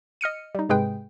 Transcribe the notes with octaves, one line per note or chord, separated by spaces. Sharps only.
D#5 F6 C#7 D#7
G3 D#4
G#2 C3 G#3 G#4 B4 G5